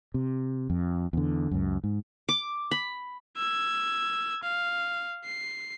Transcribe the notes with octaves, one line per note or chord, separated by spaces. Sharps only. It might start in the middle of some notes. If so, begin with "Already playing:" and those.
C3
F2
E2 D3
C#2 F#2
G#2
D6
B5
E6 G#6
F5
C7